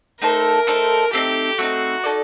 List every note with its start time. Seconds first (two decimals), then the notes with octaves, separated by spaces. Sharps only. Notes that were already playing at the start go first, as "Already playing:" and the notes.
0.21 A3 D#4 A4 A#4 C5
0.67 A3 D#4 A4 C5
1.13 A3 C4 D#4 G4
1.58 A3 C4 D#4 F#4
2.03 D#4 A4 D5